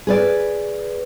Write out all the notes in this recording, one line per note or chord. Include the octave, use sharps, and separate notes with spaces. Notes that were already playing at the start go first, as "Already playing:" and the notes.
G#4 B4 D5